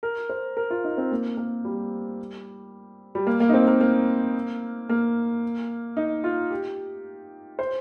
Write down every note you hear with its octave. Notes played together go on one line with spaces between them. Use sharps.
A#4
C5
A#4
F4
D#4
C4
A#3
A#3
G3
G3
A#3
A#3
D#4
C4
A#3
A#3
A#3
D#4
F4
G4
C5